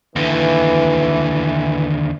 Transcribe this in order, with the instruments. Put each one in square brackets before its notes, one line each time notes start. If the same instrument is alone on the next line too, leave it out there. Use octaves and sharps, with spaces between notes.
[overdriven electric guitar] D#2 D3 [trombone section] E3